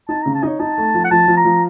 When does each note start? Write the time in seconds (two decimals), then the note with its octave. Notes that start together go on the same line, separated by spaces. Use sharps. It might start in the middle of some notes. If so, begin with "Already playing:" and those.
0.09 D#4 A5
0.22 C#3 A#5
0.35 A5
0.43 D#4 D#5
0.47 C#5
0.60 D#4 A5
0.78 A3
0.94 F3
1.04 F#5
1.11 F3 A5
1.28 F3
1.37 A#5
1.45 F3